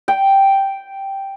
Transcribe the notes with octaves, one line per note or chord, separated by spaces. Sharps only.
G5